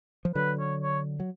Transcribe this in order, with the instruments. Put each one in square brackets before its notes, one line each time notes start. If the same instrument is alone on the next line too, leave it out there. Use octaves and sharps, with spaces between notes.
[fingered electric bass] F3
[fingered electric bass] D3 F#3 [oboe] B4
[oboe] C#5
C#5
[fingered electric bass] F#3